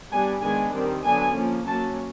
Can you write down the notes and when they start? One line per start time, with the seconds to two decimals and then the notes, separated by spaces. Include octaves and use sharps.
0.12 G3 B3 D4 G#5
0.42 D#3 G#3 B3 D4 G#5
0.73 D#3 G3 C4
1.04 D3 F#3 B3 D4 G#5
1.35 F3 A#3 C#4
1.65 F#3 A#3 C#4 A5